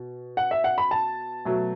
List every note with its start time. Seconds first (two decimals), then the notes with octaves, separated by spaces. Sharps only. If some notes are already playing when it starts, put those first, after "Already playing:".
Already playing: B2
0.37 F#5
0.51 E5
0.64 F#5
0.78 B5
0.91 A5
1.45 B2 F#3 A3